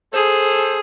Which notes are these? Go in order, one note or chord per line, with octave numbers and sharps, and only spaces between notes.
G#4 A4 C5